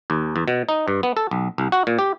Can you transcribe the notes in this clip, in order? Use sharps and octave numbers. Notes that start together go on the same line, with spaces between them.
D#2
E2
B2
D#4
G2
B3
A4
B1
C2
F#4
A#2
G4